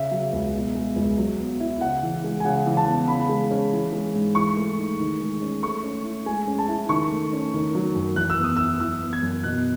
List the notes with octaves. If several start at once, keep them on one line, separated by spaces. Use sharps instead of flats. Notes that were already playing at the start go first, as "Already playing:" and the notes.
Already playing: C#3 E5
F#3
C#2
B2
G#3
C#2
F#3
B3
E4
C#3 F#5
E3
G#3
G#5
C#3 F#5
E3
A5
B3
C#3 B5
G#3
C#4
E3
G#3
G#2
E3 C#6
A3
D#4
D#3
G#3
C#4
A3 C#6
C#4
E4
G#3 G#5
C#4
A5
E4
D#3 C#6
A3
C#4
D#3
F#3
F#2
E3 F#6
E6
B3
D#6
E4 E6
E3 E6
B3
G#6
F#2
B2 F#6